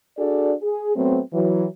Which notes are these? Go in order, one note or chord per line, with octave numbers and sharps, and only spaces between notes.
D4 F#4 G#4 A4 D5
G#4
F#3 A3 B3 C4
E3 F#3